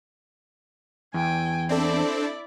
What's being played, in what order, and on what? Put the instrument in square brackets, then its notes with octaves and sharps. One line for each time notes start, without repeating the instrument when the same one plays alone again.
[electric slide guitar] E2 [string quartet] G5 G#5
[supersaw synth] C4 D4 A4 [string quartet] E4 D5